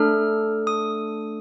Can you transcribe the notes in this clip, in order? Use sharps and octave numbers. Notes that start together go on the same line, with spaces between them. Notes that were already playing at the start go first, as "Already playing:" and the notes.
Already playing: A3 D4 A4 F6
D#6